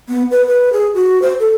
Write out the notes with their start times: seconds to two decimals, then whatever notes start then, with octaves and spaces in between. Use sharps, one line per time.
0.09 B3
0.31 B4
0.47 B4
0.73 G#4
0.94 F#4
1.22 C5
1.40 A4